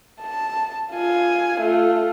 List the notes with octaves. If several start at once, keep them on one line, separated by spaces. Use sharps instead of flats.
A5
F4 G#5
A3 F4